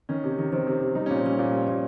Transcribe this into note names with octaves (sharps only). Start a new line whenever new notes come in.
D#3 C#4
C3
D#3
D#3 C4
C3
C3
G3 D#4
A#2 C#4
C4
G3 C#4
A#2
G3
A#2